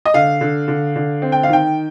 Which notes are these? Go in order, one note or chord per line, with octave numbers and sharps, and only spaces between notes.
D#5
D3 F5
D3
D3
D3
C4
G5
F5
D#3 G5